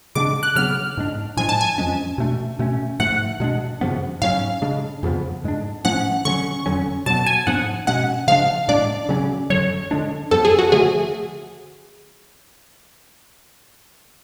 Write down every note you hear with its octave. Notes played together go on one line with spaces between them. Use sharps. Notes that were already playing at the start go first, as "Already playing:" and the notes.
C#3 G#3 B3 D4 D6
F#6
C#3 F#3 B3 F6
G#2 G#3 D4
A2 F3 G#3 D4 G#5
A5
G#5
F2 F3 G#3 C#4
B2 A3 D4
B2 A3 C#4
G#2 F3 A3 F#5
B2 G#3 D4
F#2 C#3 F3 B3
G#2 F#3 A3 C#4 F5
C#3 G#3 D4
F2 C#3 F3 B3
G#2 G#3 D4
A2 F3 A3 C#4 F#5
D3 F#3 C#4 C#6
F2 D3 F#3 C#4
B2 F#3 B3 A5
G#5
G#2 F3 B3 D4 F#5
B2 G#3 C#4 F#5
C#3 F3 G#3 D4 F5
A2 G#3 D4 D5
C#3 F#3 C#4
F#2 D3 F#3 C#5
D3 G#3 D4
F#2 F3 B3 A4
G#4
F#4
D3 F3 A3 G#4